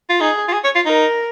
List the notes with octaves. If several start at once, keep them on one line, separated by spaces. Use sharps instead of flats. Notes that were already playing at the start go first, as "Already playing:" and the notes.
F4
D#4 G#4
F4
G#4
C#5
F4
D#4 A#4